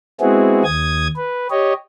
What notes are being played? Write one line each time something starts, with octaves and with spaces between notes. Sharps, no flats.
G#3 B3 C4 E4 F#4 G#4
D#2 D#6 G#6
B4
G4 C#5 D#5